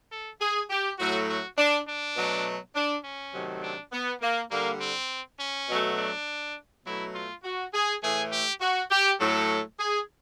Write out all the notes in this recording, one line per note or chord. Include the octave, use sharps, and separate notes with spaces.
A4
G#4
G4
A2 F#3 A3 F#4
F#4
D4
D4
B2 F#3 A3
D4
C#4
C3 D#3 F#3 A3
D4
B3
A#3
D3 G3 A#3
C4
C#4
B2 F#3 A3
D4
B2 F#3 A3 E4
F4
F#4
G#4
A2 E3 A3 G#4
G4
F#4
G4
A2 F#3 A3 A4
G#4